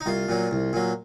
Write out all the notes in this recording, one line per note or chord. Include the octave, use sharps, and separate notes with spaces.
D#4
C2 F4
A#2 F#3
C2
A#2 F#3